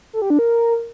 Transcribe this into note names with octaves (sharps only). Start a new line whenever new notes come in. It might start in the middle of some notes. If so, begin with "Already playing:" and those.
A4
G4
D4
A#4